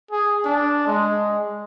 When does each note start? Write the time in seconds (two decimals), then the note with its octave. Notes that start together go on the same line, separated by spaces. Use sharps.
0.11 G#4
0.45 D4
0.87 G#3